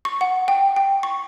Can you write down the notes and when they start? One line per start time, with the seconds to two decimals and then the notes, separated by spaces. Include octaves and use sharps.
0.05 C#6
0.21 F#5
0.48 G5
0.76 G5
1.03 C#6